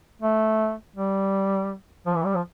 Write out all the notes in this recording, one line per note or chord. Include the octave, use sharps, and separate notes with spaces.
A3
G3
F3
E3
G3
F3